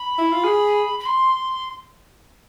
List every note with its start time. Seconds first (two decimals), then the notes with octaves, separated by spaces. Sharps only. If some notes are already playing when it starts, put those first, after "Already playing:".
Already playing: B5
0.18 E4
0.32 F4
0.44 G#4
1.00 B5
1.06 C6